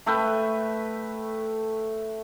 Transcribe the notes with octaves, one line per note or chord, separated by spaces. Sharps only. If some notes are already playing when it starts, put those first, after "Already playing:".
A3 B4 E5 G5